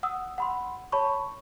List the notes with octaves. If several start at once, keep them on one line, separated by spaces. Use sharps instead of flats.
F#5 D#6 E6
F#5 B5 C6
C#5 A5 B5 C#6